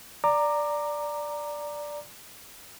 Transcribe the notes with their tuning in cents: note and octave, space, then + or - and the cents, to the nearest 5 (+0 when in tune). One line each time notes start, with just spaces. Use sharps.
D5 +0 A#5 -5 D6 +20